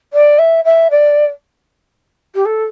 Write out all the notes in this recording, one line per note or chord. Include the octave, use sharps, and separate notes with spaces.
D5
E5
E5
D5
G4
A4